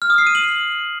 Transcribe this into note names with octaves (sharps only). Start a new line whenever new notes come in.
F6
D#6
C7
D#7
F#7